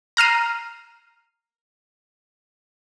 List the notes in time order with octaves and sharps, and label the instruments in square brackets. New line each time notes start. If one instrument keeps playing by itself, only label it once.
[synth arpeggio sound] A#5 F6 C7 D#7